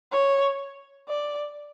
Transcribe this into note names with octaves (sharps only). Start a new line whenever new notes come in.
C#5
D5